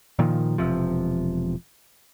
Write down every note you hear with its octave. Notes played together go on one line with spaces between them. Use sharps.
A#2 D#3 F3
E1 C3 F3